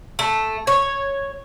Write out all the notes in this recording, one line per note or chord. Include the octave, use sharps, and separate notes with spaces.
A3
C#5